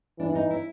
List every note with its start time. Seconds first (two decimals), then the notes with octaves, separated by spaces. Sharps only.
0.19 E3 D4
0.30 D4
0.35 D#4
0.51 E4